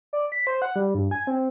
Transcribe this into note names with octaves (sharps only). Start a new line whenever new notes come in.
D5
B6
C5
F#5
G3
G2
G#5
C4